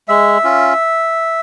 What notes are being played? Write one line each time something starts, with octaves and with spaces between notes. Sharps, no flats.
G#3 E5
C#4 F4